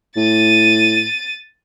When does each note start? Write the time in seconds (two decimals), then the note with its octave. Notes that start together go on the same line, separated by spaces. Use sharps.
0.16 A2 A6 D#7